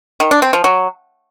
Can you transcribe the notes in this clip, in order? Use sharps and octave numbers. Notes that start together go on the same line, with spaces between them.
D#3
D4
C4
F3
F#3